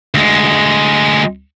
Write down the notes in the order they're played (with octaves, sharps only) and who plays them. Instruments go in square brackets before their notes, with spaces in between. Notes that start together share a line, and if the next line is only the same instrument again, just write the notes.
[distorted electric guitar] D2 G#3